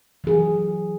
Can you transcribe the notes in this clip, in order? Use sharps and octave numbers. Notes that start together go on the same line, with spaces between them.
E3 F#3 G#4